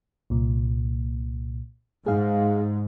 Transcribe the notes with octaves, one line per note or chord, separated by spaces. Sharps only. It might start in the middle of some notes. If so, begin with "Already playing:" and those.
C2 A#2
G#2 G#4 F5